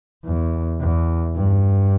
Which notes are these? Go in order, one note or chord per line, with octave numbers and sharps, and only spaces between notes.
E2
E2
G2